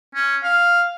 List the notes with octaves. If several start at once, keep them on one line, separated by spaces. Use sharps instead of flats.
C#4
F5